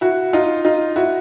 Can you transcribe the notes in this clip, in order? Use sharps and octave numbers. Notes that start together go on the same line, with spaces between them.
E4 F#4
D#4 F4
D#4 F4
E4 F#4